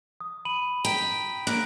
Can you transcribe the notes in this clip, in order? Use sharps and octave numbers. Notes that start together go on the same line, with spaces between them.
D#6
B5 D#7 F#7
G5 A#5 B6
A#3 F#6 D7